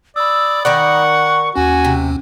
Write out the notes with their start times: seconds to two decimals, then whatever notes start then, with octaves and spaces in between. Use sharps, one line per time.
0.16 D5 B5 D#6 E6
0.65 D#3 A#4 D5 F#5 C#6
1.56 D#2 C#4 F#4 G#5
1.84 C3